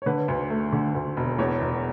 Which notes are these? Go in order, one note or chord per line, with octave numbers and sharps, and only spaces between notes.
C#5
D3 B4
D2
A3
D3
D2
E1
E2 C#5
E1